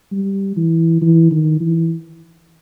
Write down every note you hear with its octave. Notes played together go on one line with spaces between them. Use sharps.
G3
E3
E3
D#3
E3